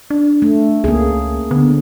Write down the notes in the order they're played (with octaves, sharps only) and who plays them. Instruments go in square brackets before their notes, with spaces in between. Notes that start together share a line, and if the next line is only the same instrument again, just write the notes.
[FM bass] D4
[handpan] A3
[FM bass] C#2 [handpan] A#3 C#4 G#4
[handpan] D3 [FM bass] B3